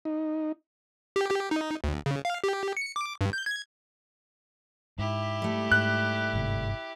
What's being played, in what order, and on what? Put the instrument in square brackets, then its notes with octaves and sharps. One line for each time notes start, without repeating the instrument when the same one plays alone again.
[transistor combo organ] D#4
[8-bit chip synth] G4
G4
D#4
D2
C#3
F5
G4
C#7
D6
G2
G6
G#6
[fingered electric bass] G#2 [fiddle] E4 G4
[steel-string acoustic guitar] G3 A3
[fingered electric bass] G#2 [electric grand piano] F#6
[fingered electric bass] G1 G#2 C3